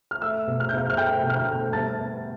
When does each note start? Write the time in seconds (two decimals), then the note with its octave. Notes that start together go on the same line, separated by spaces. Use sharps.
0.11 F6
0.22 A3 E5 E6
0.47 B2
0.60 F6
0.69 G6
0.73 B2 F5 F6
0.90 F6
0.97 A3 G5 G6
1.23 B2
1.30 F6
1.36 G5 G6
1.48 A3
1.73 G3 A5 A6
1.98 B3